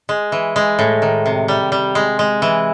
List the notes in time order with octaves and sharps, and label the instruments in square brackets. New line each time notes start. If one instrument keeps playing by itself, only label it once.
[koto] G#3
E3
G#3
A2
D#3
C3
G3
G3
G#3
G#3
E3